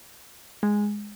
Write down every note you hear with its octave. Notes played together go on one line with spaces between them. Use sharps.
G#3